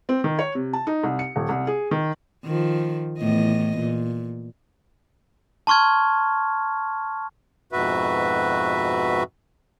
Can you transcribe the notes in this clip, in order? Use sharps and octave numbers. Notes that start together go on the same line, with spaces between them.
C4
D#3
C#5
C3
A5
D#4
C2
C#7
D#1
C2
G#4
D#3
D#3 F3
E2 A2 D#5
A#2
A5 C6 C#6 F6 G#6
F2 G#2 B2 F#4 B4 E5